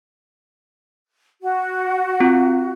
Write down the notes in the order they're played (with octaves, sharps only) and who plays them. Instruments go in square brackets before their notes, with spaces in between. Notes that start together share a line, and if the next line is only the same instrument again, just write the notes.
[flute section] F#4
[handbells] C4 F4